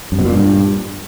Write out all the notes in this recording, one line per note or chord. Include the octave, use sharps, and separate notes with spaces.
F#2
B2
A#2
G2